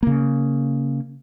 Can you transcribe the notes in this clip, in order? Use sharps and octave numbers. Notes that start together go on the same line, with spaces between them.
C#3 A#3